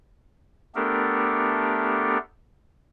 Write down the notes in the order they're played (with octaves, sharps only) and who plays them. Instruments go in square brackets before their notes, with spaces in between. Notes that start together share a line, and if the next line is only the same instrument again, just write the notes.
[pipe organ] A3 B3 D4 G4 A4 A#4